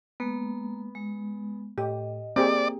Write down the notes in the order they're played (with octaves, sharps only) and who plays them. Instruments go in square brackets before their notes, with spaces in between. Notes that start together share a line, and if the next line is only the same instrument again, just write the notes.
[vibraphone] G#3 A#3 [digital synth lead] B3
[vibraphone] G#3
[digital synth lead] A2 [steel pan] G4 [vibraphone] D#5
[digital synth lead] A#3 [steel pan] C4 G4 G#4 [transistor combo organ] D5